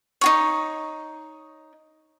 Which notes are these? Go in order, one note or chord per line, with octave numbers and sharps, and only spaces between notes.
D#4 F#4 C#5